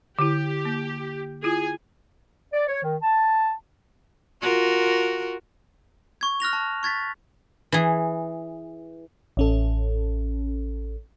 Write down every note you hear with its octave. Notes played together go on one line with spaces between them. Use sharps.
D3 E4 G4
A#3
E4 F4 G#4 G#5
D5
C#5
D#3
A5
F4 F#4 A#4
C#6 G#6
F6 F#6 A#6 F7
A5
C#6 G#6 A6 B6
E3 G#4
A1 C#4 A4